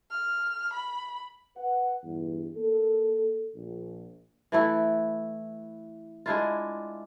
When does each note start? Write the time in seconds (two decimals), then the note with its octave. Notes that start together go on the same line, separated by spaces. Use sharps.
0.11 F6
0.73 B5
1.57 B4 F#5
2.04 E2 G2
2.55 A#3 A4
3.55 A#1
4.52 E3 A3 E4
6.26 G#3 D4 E4 F4